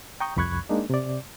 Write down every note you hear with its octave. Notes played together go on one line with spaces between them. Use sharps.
G5 A#5 C#6 D#6 G6
C2 F2 B5 C#6 F#6 G#6
G#3 A#3 D4 D#4
C3 D5